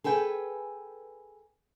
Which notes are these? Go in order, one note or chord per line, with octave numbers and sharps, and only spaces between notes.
G#4 A4 B4 G5 G#5